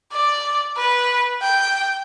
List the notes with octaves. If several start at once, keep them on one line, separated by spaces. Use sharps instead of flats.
D5
B4
G5